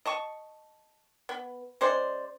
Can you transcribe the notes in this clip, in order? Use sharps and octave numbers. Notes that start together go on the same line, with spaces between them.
D#5 A5 C#6
B3
G#3 C#4 C5 D5